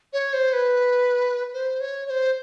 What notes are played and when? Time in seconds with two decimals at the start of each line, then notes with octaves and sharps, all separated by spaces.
0.13 C#5
0.33 C5
0.53 B4
1.54 C5
1.80 C#5
2.07 C#5
2.10 C5